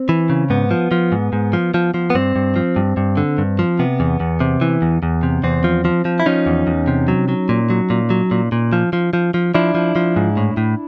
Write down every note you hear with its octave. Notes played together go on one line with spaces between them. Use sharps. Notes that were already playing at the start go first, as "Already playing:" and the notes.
Already playing: C4
E3
C#3
G#2 B3
F3
F3
G#2
G#2
F3
F3
F3
B3
G2 C4
G2
F3
G2
G2
D3
G2
F3
C3 B3
E2
E2
C3
E3
E2
E2
C3
E2 C4
F3
F3
F3
E4
F3 C#4 D#4
E2
E2
C3
F#3
F#3
A#2
F#3
A#2
F#3
A#2
A#2
F3
F3
F3
F3
F3 D4 E4
F3
F3
G#2
A2
A2